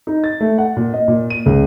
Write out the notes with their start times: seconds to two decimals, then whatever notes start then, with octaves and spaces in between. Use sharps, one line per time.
0.07 D#4
0.24 A6
0.41 A3
0.58 F#5
0.77 A#2
0.94 D#5
1.08 A#2
1.30 D#7
1.46 C#2